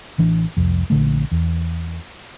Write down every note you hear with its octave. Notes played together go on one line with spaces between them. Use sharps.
A1 E3 D4
C2 F2
A#1 D3 A3
E2